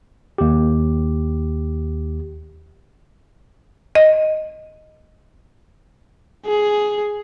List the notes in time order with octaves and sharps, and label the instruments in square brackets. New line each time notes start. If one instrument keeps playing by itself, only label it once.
[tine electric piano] D#2 G4
[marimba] D#5
[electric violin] G#4